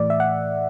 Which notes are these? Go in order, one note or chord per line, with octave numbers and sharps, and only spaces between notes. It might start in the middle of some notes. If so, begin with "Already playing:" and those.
Already playing: A2 E3 A3 D5
E5
F#5